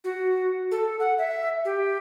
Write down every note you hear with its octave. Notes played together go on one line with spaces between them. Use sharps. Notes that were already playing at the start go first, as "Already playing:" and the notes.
F#4
A4
F#5
E5
G4